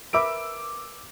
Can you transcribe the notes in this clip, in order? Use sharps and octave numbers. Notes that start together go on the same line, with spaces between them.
A#4 B4 E5 D6 E6 D7